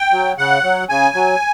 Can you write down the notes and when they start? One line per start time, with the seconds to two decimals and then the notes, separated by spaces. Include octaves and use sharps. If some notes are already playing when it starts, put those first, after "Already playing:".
Already playing: G5
0.13 F#3
0.38 C#3 F#5
0.64 F#3
0.89 C#3 G#5
1.15 F#3